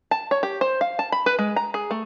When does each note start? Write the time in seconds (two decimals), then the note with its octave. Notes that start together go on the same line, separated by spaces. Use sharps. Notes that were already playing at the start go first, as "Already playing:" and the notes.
0.11 A5
0.31 C#5
0.43 G4
0.61 C5
0.81 F5
0.99 A5
1.12 B5
1.26 B4
1.39 G#3
1.56 A#5
1.74 G#4
1.91 A3